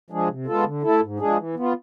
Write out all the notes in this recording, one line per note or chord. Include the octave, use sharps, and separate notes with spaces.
F3 G#3 D4 G#4
C3
G#3 B3 F4 A4
D3
A3 E4 A4
G#2
F3 G#3 D4 G#4
E3
B3 F4